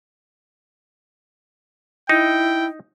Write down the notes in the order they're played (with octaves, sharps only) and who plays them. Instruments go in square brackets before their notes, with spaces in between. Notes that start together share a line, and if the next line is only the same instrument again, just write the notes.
[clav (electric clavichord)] D#4 [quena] E4 [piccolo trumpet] G5